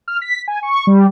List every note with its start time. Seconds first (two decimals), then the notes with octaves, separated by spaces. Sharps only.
0.08 F6
0.22 B6
0.48 G#5
0.63 C#6
0.87 G3